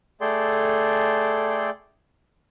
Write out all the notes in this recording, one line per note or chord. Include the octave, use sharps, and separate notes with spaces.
A3 G#4 A4 D5 G5 C6